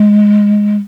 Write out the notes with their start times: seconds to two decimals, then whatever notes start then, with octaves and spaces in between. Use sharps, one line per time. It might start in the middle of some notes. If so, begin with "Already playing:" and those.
Already playing: G#3